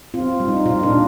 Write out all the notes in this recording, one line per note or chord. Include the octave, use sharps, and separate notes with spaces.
C4 F4
G3
D#4
A#2 F4
D4
A#2